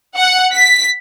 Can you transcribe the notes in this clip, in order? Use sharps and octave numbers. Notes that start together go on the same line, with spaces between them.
F#5
B6